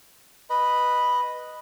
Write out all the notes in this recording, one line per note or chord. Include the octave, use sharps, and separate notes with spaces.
B4 D#5 B5